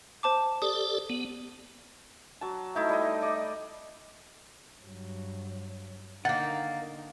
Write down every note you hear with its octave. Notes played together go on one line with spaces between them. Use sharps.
C5 A5 D6
G4 A4 D5 D#6
B3
F#3 A5
A3 D#4 E4
G3 D#5
D5 D#5
G2 F#3
D3 D#3 A#3 D#4 F#5 A6